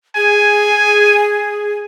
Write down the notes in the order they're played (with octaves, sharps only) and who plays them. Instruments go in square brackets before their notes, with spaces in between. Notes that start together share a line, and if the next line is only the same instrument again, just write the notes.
[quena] G#4 [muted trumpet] G#5